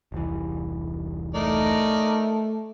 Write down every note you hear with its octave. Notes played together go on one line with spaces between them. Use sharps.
E1 C2 E3
A3 D#4 A#4 D5